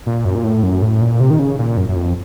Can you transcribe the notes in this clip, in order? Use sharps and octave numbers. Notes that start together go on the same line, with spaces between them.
A#2
F#2
A#2
A2
F#2
A2
A#2
C3
D#3
C#3
A#2
F#2
F#2
F2